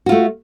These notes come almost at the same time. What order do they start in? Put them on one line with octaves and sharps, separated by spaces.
F#4 F4 A3